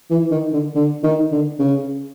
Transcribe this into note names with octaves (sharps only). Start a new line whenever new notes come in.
E3
D#3
D3
D3
D#3
D3
C#3